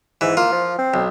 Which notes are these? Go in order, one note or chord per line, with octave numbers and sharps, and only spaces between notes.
G#2 E3
A#3 F4
F3
C4
B1